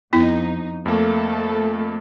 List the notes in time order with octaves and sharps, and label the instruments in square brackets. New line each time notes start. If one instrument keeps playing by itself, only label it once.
[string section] F2 D#4 [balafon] B3 E4
[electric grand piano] F2 A#3 [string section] A3 A4